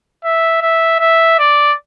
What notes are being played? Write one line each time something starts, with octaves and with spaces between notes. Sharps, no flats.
E5
E5
E5
D5